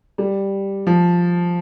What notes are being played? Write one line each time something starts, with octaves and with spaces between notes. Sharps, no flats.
G3
F3